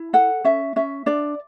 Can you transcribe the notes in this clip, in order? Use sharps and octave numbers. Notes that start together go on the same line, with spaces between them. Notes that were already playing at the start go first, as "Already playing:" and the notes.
Already playing: E4
A4 F#5
C#4 E5
C#4 E5
D4 D5